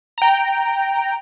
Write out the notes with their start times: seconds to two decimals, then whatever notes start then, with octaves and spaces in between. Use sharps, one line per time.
0.18 G5 A#5